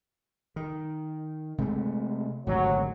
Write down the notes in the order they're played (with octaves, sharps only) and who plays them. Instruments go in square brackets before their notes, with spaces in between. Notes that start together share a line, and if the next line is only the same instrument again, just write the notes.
[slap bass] D#3
C3 G#3 A3
[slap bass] G#1 D2 C3 [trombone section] F#3